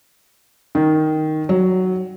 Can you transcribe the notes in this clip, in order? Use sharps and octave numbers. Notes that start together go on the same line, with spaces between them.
D#3
F#3